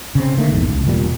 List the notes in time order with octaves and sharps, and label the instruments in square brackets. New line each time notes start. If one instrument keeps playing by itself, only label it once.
[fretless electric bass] C#3 C4
D3 D#3 A3 A#3
A#1 E2 G#2
C#2
E1 A#2 G3